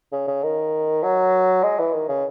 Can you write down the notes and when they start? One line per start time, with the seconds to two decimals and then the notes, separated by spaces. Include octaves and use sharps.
0.13 C#3
0.28 C#3
0.43 D#3
1.03 F#3
1.63 G#3
1.79 E3
1.94 D#3
2.09 C#3